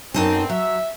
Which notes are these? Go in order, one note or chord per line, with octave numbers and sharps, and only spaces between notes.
B1 F#2 C4 D#4 A5
F#3 E5